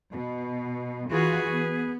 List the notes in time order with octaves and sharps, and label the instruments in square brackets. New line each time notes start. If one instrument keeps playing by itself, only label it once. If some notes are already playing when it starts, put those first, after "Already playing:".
[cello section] B2
[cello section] E3 F4 F#4 [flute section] G#4 B4
[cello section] B3